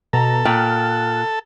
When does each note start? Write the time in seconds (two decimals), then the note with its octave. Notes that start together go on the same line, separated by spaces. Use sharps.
0.13 B2 A4 A#5
0.45 A#2 G5 F6 F#6